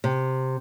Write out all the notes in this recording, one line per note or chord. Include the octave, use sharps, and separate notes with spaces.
C3